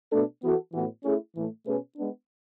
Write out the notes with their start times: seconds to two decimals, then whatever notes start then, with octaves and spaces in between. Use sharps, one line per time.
0.11 B2 A3 D4 A4
0.42 E3 B3 F#4 A4
0.73 A2 E3 B3 F#4
1.04 A3 C#4 E4 G#4
1.35 A2 E3 A3
1.66 B2 A3 C#4 G#4 B4
1.96 G#3 B3 D4